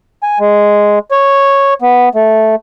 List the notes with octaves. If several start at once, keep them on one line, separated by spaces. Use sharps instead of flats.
G#5
G#3
C#5
B3
A3